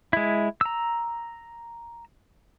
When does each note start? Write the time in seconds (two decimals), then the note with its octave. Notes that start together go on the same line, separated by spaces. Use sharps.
0.13 G#3 E4
0.61 A#5 E6